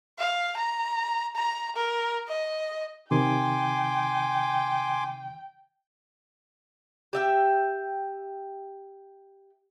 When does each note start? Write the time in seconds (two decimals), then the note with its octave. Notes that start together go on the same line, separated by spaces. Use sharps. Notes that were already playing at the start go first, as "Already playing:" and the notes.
0.19 F5
0.57 A#5
1.35 A#5
1.76 A#4
2.28 D#5
3.11 C3 D#3 G5 G#5 C6 D6
7.13 G4 E5 G5